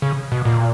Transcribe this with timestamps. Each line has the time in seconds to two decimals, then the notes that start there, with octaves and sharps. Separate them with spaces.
0.02 C#3
0.32 B2
0.45 A#2